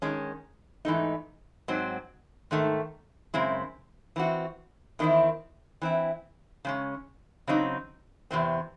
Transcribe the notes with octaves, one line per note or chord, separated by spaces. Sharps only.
D#3 G#3 C#4
G#2 E3 A3 D#4
G#2 F#3 C4
G#2 D#3 A3
F#2 C#3 G#3 C4 E4
E3 C4 F#4
E2 D#3 A3 C4 E4
E3 C4 E4
C#3 G#3 C#4
C#3 F#3 C4 D#4
E2 C3 E3 C4